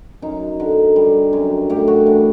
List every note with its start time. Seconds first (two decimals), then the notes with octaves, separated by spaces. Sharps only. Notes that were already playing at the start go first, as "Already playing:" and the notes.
0.22 F#2 D#4
0.60 D3
0.96 G3
1.33 F#2
1.70 A2 G4
1.88 F#4
2.06 E3 D4